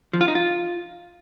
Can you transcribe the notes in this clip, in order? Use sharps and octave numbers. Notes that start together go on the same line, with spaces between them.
F3
F4
D#4
F4